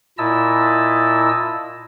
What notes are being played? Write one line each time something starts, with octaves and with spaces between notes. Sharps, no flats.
A#2 E4 D#5 A5 E6